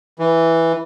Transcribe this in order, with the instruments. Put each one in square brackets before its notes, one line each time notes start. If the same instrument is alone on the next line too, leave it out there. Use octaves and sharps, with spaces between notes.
[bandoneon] E3